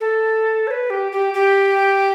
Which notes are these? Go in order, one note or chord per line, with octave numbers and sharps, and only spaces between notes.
A4
C#5
B4
G4
G4
G4